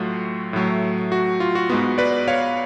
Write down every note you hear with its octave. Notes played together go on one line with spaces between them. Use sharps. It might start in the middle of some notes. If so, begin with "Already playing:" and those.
Already playing: A2 F#3 A3 F4 F#4
A2 F#3 A3
F#4
F4
F#4
G#2 G#3 B3 F#4
B4 D5
C#5 F5